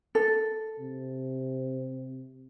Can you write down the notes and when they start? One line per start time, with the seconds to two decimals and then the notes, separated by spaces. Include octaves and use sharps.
0.15 A4
0.79 C3